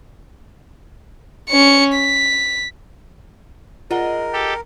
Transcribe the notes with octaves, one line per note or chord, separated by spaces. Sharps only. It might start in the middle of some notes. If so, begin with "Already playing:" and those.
C#4 C#7
B6
G#3 D#4 F4 A#4 F#5 G7
G4 A4